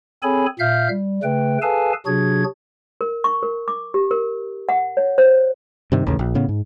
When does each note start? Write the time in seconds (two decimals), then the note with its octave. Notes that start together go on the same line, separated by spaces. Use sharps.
0.23 C4 G#4 A4 C#5 G#5 B5
0.59 A#2 E5 F5 F6 G6
0.89 G3
1.23 C#3 A3 B4 G5
1.62 G#4 A4 B4 F5 G#5 A5
2.06 C3 F#3 D4 F#4 G#4 G#6
3.01 A#4
3.24 C#6
3.43 A#4
3.68 D6
3.94 G4
4.11 A#4
4.69 F#5
4.97 C#5
5.18 C5
5.92 G2 C3 D#3
6.06 A1 D#2 C#3
6.19 A#1
6.35 A2 C#3 B3
6.49 G#2